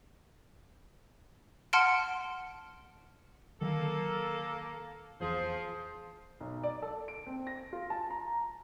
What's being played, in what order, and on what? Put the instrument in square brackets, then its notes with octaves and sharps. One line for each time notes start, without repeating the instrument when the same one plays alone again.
[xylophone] F#5 A5 C6 F6 C#7 D7
[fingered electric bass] D3 D#3 F#3 [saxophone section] A#3 A4
[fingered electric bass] F1 E2 [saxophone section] F3 G#4 C5
[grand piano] B1
D5
A4
D7
C4
A#6
F4
A5
A#5